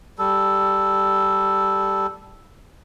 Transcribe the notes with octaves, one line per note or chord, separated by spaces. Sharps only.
G3 A4